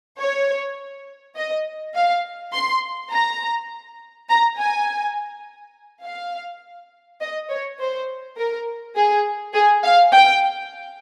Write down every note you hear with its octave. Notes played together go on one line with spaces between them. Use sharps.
C#5
D#5
F5
C6
A#5
A#5
G#5
F5
D#5
C#5
C5
A#4
G#4
G#4
F5
G5